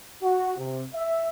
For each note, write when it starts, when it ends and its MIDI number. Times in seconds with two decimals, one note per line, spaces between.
0.22 0.57 66
0.57 0.83 48
0.94 1.29 76